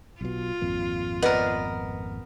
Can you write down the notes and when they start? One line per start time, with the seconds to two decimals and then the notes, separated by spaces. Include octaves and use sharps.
0.21 B1 B2 F4
0.61 G#1 F2 A#2
1.22 B3 A#4 B4 D5 D#5